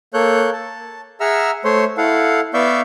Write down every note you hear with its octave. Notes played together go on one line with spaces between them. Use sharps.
A#3 A4 C#5 F#6 G6
A5
G#4 E5 F#5 A#5 E6 F6
A3 C5 C#5 C6
E4 A4 F5 F#5
B3 D5 E5 F5 C#6 G6